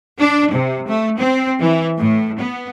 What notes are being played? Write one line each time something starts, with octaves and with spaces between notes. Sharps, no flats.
D4
C3
A3
C4
E3
A2
B3